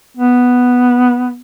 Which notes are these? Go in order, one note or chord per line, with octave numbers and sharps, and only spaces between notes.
B3